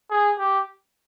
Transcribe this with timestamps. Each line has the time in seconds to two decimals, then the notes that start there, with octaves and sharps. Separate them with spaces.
0.10 G#4
0.39 G4